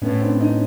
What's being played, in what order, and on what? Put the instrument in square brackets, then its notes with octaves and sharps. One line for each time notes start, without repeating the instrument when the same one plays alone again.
[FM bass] A2 [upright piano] B3 C#4
[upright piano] C4 D4
C#4 D#4